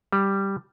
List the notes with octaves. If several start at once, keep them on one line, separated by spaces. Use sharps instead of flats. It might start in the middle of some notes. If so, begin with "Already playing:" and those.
G3